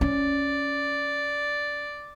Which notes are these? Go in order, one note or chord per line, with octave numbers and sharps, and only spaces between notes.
C#4 D5